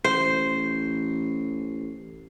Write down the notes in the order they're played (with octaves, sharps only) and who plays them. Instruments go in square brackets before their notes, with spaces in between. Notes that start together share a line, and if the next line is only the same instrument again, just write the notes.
[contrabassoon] A1 [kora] C5 [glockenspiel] C7